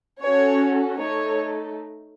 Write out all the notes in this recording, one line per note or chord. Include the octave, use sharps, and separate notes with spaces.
C#4 F#4 A4 C#5
A3 D#4 A4 C#5